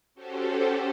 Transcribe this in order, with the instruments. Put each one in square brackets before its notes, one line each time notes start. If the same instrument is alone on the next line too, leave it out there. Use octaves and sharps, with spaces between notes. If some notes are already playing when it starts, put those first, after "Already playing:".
[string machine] C#4 F#4 G4 A4 C5